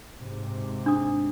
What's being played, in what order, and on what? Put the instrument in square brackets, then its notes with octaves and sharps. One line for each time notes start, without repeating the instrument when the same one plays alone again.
[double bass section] G#2 C3
[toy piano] D4 D#6